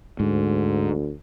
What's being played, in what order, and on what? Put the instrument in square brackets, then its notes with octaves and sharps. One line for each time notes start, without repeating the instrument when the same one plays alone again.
[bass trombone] D2 [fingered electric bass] G#2